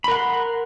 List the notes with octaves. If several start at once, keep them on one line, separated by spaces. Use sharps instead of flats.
A#4 F#5 B5 C6